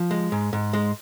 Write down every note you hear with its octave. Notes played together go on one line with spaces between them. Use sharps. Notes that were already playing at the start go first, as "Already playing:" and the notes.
Already playing: F3
G#3
G#2
G#2
G#3